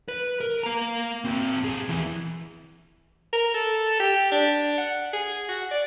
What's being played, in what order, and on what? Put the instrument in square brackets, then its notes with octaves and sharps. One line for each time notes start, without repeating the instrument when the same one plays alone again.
[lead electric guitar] B4
A#4
A#3 A#5
C4 F#4
B1 G#4
D#2 E3
[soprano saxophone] A#4
A4
G4
D4
F#5
G#4
F#4
D5